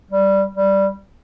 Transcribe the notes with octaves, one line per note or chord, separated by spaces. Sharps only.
G3
G3